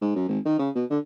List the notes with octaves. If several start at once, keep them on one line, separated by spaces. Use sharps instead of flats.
G#2
F#2
G#1
D#3
C#3
B2
D3